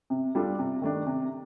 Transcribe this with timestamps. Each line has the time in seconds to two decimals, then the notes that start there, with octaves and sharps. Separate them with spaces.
0.10 C3
0.35 G3 D4 F4 A4
0.59 C3
0.82 D#3 A3 D4
1.07 C3